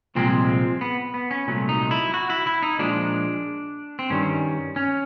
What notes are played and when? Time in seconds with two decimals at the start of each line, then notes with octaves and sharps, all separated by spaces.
0.15 C2 A#2 F3 G#3 C4
0.81 B3
1.14 B3
1.31 C#4
1.47 C2 A#2 F#3 A3
1.69 D#4
1.91 E4
2.14 F#4
2.30 E4
2.47 E4
2.63 D#4
2.79 A#2 F3 G#3 D4
3.99 C4
4.10 G2 D#3 G3 C#4
4.76 C#4